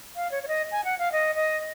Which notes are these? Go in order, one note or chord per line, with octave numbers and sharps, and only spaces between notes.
F5
C#5
C#5
D#5
G#5
F#5
F5
D#5
D#5